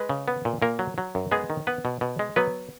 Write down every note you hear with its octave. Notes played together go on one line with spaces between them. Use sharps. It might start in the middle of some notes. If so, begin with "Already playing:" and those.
Already playing: G#3 B4
C#3
B3
A#2
A#2 A#3 A#4
F#3
F#3
F#2
G#3 B3 G#4
D#3
B3 B4
B2
B2
G#3
F#3 B3 B4